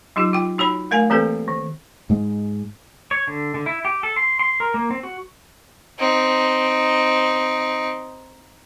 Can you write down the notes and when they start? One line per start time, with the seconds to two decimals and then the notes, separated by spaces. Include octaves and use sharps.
0.16 F#3 D#4 F4 G4
0.33 F4 G5
0.58 D#4 F#4 C#5 B5
0.91 A3 A#4 F5 G#5
1.10 E3 A#3 C4 G4 A4 B4
1.48 D#3
2.10 G#2 G#3
3.11 C#5
3.27 D3
3.54 D3
3.66 E4
3.85 G4
4.03 A4
4.16 C6
4.39 C6
4.60 A#4
4.74 A#3
4.91 C4
5.03 F#4
5.99 C4 D#4